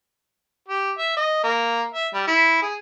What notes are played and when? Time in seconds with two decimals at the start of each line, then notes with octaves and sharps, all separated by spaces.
0.68 G4
0.98 E5
1.17 D#5
1.43 A#3
1.94 E5
2.14 G3
2.27 E4
2.62 G#4